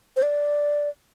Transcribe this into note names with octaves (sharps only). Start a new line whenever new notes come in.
C5
D5